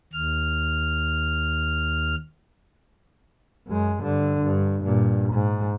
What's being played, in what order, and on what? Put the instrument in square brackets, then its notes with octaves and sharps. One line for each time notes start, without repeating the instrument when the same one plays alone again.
[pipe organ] D#2 F6
[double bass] F#2 G#3
G2 D3
G2
G2 A#2
G#2